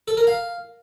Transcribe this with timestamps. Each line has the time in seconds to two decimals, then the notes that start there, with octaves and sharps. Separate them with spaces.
0.08 A4
0.17 A#4
0.27 F5